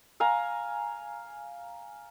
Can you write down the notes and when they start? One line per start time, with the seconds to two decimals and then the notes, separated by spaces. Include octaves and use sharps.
0.20 F5 G#5 A#5